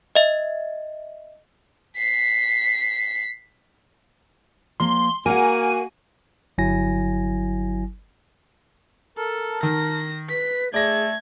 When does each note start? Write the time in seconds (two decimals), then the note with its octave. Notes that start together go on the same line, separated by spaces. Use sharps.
0.15 D#5 E5
1.97 B6 C7
4.80 F3 A#3 C6
5.26 A#3 F#4 A#4 F#5 G#5
6.58 G1 F#3 E4 G#5 A#6
9.18 A4 A#4 A5
9.63 D#3 A#6
10.29 B4 B6
10.74 A3 G#4 D5 G#6 A#6